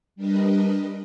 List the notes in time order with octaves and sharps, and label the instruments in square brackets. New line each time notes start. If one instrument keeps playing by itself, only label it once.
[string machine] G3 D4 A#4 B4 D#5